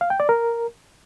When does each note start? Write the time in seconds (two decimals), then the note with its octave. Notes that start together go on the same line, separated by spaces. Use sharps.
0.01 F5
0.10 G5
0.20 D5
0.29 A#4